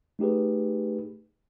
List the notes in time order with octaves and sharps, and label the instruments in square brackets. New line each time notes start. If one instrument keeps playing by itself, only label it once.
[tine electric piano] A3 D#4 G4 G#4 B4